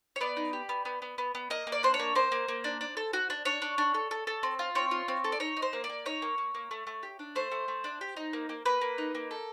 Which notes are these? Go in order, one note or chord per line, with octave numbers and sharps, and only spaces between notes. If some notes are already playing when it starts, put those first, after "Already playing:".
C#5
B3 D5
D#4
G4
B3
B3
B3
B3
B3
A#3 D#5
A#3
D5
D4 C5
C#5
A#3
A#3 C5
A#3
A#3
D4
D4
A4
F#4
D4
D4 C#5
D4
D4
A4
A4
A4
C4
F4
C4 C#5
F4
C4
A4
D5
D#4 C#5
D#4
C5
A#3
D5
A#3
D#4 C#5
A#3
A#3
A#3
A3
A3
G4
D4
A3 C5
A3
A3
D4
G4
D#4
A#3
A#3
A#3 B4
A#3
D#4
A#3
A4